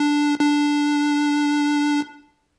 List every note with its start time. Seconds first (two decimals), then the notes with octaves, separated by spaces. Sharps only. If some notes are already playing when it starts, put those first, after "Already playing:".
Already playing: D4
0.40 D4